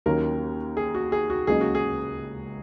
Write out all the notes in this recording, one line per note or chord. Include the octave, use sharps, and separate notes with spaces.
D#2 D#3 F#3 A#3 C#4 A#4
G#4
F#4
G#4
F#4
C#2 C#3 F#3 A#3 D#4 G#4
F#4
G#4